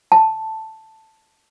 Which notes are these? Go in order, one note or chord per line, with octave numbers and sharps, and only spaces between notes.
A5